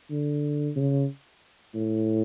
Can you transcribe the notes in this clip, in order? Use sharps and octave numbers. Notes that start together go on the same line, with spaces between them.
D3
C#3
A2